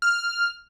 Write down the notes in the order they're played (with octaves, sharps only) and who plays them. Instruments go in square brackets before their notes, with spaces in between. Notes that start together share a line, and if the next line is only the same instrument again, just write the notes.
[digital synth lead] F6